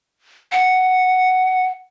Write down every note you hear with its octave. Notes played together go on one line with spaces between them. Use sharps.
F#5